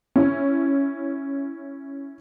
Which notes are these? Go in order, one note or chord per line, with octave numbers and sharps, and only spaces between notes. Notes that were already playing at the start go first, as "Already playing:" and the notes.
C#4 E4